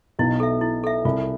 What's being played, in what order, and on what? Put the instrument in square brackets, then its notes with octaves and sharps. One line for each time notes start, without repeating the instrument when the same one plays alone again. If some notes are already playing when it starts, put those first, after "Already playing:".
[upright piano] B1 B2 [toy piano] E4
[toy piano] A4 E5
E4
A4 E5
[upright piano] C2 C3 [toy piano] F4